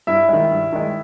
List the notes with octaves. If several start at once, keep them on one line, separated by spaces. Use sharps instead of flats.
G2 E4 E5
D#3 G#3
G2
D#3 G#3